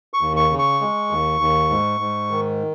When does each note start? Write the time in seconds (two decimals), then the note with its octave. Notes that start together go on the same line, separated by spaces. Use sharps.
0.14 C#6
0.21 D#2
0.37 C#6
0.50 C#3
0.59 C#6
0.81 G#3
1.11 D#2
1.41 D#2
1.70 G#2
2.01 G#2
2.31 D#3